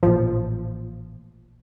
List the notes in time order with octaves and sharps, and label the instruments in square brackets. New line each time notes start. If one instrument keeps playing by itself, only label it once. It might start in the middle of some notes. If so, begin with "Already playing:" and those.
[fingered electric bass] A1 A#2 [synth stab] F3